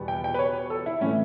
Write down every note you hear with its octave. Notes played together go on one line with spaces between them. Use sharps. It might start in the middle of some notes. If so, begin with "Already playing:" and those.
Already playing: E2 B2 G3 B3
G5
G5
B4
C#5
A4
E4
A2 E3 A3 C#4